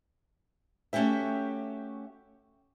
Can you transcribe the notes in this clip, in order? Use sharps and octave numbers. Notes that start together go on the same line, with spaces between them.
A3 C#4 F#4 G4 E5